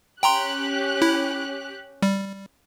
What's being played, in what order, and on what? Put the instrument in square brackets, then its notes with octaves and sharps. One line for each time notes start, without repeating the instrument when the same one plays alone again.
[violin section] C#4 G4 F#6 [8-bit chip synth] G5 A#5 C6
[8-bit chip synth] E4
G3